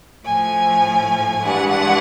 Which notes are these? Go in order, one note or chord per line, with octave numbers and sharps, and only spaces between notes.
A2 F3 A3 G#5
G2 E3 G#3 F#5
F#5